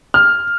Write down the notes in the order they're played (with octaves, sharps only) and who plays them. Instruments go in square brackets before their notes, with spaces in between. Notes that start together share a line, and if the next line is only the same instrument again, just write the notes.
[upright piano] F6